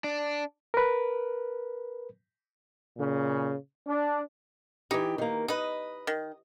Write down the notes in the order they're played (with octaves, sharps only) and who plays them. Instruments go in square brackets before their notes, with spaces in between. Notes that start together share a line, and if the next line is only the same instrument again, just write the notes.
[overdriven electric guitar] D4
[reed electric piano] A#4 B4
[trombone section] A#2 C#3
D4
[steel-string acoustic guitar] E3 G4 [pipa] D#4
[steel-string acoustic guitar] D#3 A#3
[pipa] D#4 B4 [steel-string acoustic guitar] D#5
[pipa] D#3